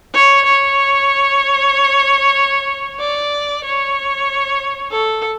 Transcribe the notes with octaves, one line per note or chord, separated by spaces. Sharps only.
C#5
C#5
D5
C#5
A4